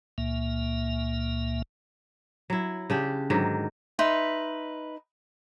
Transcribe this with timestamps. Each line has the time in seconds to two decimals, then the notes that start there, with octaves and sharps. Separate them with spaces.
0.18 C#2 A#2 A#3 E5
2.50 F#3 E4
2.90 C#3 D4 G4
3.30 G#2 D3 D#3 F#3
3.99 D#4 B4 E5 C6